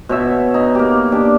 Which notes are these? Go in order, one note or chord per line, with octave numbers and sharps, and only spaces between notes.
B2 C#5 E5
D#4
A#3 G4
D4 G4